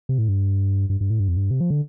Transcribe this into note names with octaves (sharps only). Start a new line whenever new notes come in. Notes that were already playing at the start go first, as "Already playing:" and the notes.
C3
A2
G2
G2
G2
A2
G2
F2
G2
C3
F3
D3